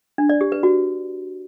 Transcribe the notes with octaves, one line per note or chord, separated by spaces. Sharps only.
D4
D5
G4
B4
F#4